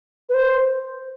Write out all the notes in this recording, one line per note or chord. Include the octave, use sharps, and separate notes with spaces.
B4
C5